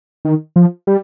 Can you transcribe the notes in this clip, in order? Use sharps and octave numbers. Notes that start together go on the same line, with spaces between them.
D#3
F3
G3